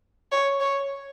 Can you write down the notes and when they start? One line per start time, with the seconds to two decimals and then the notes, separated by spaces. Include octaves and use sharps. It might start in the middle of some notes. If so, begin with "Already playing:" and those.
0.32 C#5
0.60 C#5